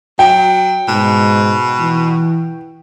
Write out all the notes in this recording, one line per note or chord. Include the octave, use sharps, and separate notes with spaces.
F#3 G5
G#2 B2
E3